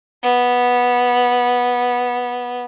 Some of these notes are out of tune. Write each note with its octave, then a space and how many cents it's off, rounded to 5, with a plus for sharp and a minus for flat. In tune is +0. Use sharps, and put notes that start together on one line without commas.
B3 -10